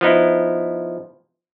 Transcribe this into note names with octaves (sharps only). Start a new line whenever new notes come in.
F3 B3 D#4 E4